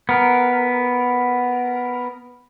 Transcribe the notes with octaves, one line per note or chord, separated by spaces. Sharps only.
B3 A#4